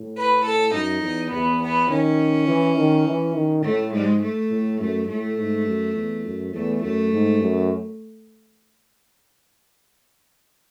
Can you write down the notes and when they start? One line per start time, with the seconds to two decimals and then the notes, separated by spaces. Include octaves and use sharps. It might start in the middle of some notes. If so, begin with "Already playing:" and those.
Already playing: A2
0.16 B4
0.45 A4
0.74 F#2 D#4
1.03 E2
1.32 E2 B3
1.61 B3
1.89 D#3 C#4
2.48 E3
2.77 D#3
3.06 E3
3.35 D#3
3.64 A2 A3
3.93 G#2 G#3
4.21 A3
4.50 A2
4.80 F#2 A3
5.09 A2 A3
5.38 G#2
5.68 F#2
5.97 E2
6.26 F#2
6.54 E2 A3
6.83 F#2 A3
7.12 G#2
7.41 F#2